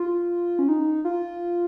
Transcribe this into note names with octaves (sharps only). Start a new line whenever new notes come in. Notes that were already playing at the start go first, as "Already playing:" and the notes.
Already playing: F4
C#4
D#4
F4